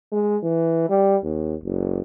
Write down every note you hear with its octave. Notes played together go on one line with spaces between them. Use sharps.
G#3
E3
G3
D#2
F#1